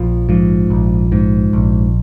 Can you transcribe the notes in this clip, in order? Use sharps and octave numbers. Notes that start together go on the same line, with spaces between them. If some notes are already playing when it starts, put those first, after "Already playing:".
Already playing: A#1 F3
G#2 F3
A#1
G#2
A#1